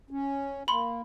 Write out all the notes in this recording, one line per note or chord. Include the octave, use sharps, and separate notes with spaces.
C#4
A#3 B5 C6